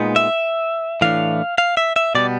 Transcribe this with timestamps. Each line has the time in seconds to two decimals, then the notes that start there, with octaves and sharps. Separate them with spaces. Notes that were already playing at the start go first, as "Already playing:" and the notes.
Already playing: A#2 G#3 B3 D#4
0.16 E5
1.01 A2 E3 A3 D4 F5
1.58 F5
1.77 E5
1.96 E5
2.15 B2 G3 B3 D5